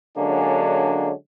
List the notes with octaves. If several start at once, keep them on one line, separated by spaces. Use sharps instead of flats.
D3 F#3 G#3 A#3 C#4 D4